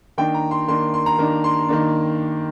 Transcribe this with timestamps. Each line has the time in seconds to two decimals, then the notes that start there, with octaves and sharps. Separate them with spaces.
0.18 D#3 A#3 D4 G5
0.34 A#5
0.51 C6
0.68 D#3 A#3 D4 C6
0.94 C6
1.06 A#5
1.18 D#3 A#3 D4
1.44 C6
1.69 D#3 A#3 D4